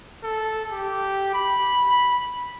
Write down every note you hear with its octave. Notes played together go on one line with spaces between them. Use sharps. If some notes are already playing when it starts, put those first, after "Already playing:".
A4
G4
B5